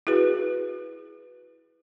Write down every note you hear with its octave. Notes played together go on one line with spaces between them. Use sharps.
E4 F#4 G#4 B4